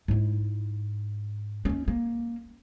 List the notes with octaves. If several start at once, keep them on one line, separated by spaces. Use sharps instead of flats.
G#2 E4
D#2 C#4
A#3